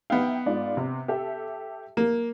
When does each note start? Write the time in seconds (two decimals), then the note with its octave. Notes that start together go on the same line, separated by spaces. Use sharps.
0.10 B3 D#4 E5 F5 G5
0.46 G#2 F4 D5
0.77 C3
1.08 G4 A4 E5
1.97 A#3